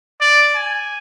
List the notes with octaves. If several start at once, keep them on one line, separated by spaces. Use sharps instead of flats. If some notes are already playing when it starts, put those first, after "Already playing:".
D5
G#5